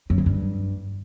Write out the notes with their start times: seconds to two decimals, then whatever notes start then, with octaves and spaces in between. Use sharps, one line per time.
0.10 F#2
0.18 C#3
0.26 G2